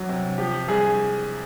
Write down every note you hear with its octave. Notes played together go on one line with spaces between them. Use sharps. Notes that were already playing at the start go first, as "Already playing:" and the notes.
Already playing: C2 F#3
C3
F3 G4
C2 G#4